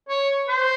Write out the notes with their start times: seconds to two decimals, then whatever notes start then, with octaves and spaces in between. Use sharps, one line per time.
0.09 C#5
0.49 C5